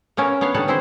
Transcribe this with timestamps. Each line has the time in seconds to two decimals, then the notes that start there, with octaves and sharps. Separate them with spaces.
0.17 A#3 B3 C#4 A4 A#4
0.41 B3 D4 C#5 F5
0.54 D3 G3 C#4 D#4 F#5 A5
0.68 E3 C4 D4 E4 F#4 C5